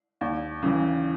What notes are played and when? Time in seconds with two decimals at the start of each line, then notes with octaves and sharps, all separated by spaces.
0.21 D#2
0.62 C#3 E3